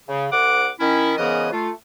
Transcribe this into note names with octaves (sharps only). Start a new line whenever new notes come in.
C#3
C2 F#5 D6
D#3 C#4 E4
G#2 C#3 E3 B3 A#4 D#5
A3 F4